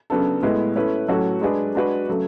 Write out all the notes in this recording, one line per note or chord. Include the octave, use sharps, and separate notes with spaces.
C#3 F#3 B3 D4 A4
A2 G#3 B3 E4 B4
A3 C#4 E4 B4
A2 F#3 C#4 F#4 A4
G#3 D4 G#4 B4
G#3 D4 F#4 B4
C#3 F#3 A3